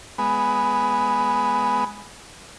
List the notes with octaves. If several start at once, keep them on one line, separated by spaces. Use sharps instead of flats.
G#3 B3